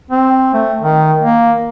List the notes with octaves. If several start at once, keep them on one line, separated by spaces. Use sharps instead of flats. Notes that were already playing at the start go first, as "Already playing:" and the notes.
C4
A3
D#3
A#3